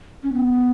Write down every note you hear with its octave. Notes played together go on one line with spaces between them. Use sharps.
C#4
B3